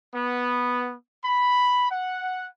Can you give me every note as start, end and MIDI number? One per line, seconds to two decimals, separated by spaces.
0.15 0.93 59
1.24 1.88 83
1.90 2.46 78